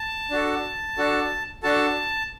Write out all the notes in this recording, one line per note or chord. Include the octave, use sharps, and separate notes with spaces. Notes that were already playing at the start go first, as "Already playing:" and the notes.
Already playing: A5
D4 F#4 A4
D4 F#4 A4
D4 F#4 A4 A5